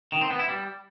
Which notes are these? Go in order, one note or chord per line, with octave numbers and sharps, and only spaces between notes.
D#3
C4
B3
E4
G3